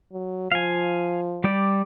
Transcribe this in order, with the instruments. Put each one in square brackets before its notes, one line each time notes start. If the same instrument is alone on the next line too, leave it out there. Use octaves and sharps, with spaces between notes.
[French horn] F#3
[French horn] F3 [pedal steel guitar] F5 G#5
[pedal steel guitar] G3 G4 D5